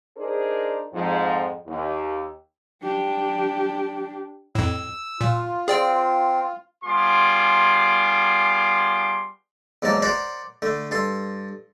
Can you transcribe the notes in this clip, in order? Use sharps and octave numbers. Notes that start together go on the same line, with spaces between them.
D4 D#4 G#4 A#4 C5 D5
F2 G#2 F3
D#2
D4 G4
F2 A2 E6
A#2 F4
C4 G#4 D5 G5
G3 B3 F4 G#4 C6 D6
E2 G#2 F#3 A#3 A5
A#4 C5 D5 F#5
D3 A3
G2 A4 C6